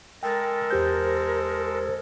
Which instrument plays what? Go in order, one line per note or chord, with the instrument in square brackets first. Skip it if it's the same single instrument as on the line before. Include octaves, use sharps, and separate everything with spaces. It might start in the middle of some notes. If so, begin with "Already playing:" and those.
[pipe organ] G#3 A4 [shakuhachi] A#4 [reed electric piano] G5 A6
[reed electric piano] E2 G4 G6 [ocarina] C5